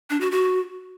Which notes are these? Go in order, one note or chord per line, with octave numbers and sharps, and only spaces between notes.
D4
F#4
F#4